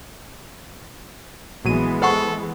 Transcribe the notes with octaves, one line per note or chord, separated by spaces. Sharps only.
A#1 E3 F#3 G#3 B3 D#7
A4 C5 F#5 C#6